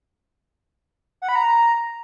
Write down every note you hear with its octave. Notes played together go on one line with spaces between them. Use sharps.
F#5
B5
A#5